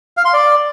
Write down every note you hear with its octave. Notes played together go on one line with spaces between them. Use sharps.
F5
C6
D5